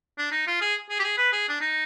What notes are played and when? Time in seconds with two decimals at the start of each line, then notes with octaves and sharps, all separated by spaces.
0.18 D4
0.31 D#4
0.47 F4
0.61 G#4
0.90 G#4
1.00 G4
1.04 G#4
1.18 B4
1.32 G#4
1.49 D4
1.61 D#4